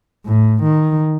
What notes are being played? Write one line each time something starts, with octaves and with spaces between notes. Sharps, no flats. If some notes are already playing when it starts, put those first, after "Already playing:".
A2
D#3